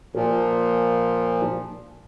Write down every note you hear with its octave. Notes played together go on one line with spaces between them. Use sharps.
A#2 F3